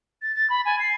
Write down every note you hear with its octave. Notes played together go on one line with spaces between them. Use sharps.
A6
A6
B5
G#5
C7